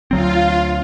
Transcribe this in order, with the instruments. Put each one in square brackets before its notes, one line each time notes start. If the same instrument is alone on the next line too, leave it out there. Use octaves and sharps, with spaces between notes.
[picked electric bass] D2 F#3 C4 [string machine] F4